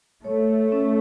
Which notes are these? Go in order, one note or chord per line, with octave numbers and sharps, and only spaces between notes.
A3 C#5
C#4